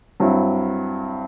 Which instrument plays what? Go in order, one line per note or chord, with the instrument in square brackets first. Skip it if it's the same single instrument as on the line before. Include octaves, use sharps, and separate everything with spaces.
[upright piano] G2 F#3 C4 E4